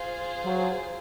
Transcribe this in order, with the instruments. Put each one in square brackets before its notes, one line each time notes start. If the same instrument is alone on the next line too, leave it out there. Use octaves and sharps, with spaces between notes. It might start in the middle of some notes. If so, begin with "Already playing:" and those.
Already playing: [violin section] F4 G#4 C5
[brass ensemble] F#3